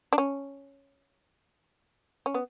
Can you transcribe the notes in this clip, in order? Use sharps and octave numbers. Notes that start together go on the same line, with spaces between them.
D4
C#4
C#4
B3